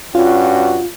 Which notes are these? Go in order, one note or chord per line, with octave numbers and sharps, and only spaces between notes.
G2 C#4 F4 F#4